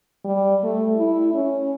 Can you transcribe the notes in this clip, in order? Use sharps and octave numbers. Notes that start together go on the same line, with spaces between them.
G3
A3
E4
C#4